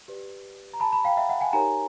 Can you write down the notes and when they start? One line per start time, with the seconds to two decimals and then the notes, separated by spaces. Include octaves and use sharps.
0.08 G4 B4 D5
0.74 A#5
0.80 A5 B5
0.93 A5 B5
1.05 F5 G5
1.17 E5 F#5
1.29 E5 F#5
1.41 F#5 G#5
1.53 D#4 G4 A#4 C#5 G#5 A#5